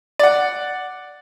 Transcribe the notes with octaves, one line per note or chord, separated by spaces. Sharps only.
D5 F#5